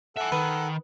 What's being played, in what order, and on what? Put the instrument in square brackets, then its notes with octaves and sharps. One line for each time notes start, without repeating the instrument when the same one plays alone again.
[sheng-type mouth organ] A4 F#5 [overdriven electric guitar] E5 G#5
[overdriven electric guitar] D#3 [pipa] B4